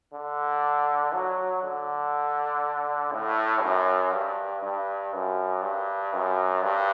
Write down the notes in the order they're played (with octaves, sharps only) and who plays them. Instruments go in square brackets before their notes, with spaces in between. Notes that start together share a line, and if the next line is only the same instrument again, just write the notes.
[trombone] D3
F#3
D3
A2
F#2
G2
G2
F#2
G2
F#2
G2